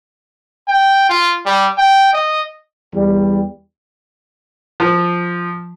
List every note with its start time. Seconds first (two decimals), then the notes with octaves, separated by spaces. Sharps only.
0.68 G5
1.09 F4
1.46 G3
1.78 G5
2.13 D#5
2.94 E2 G3
4.80 F3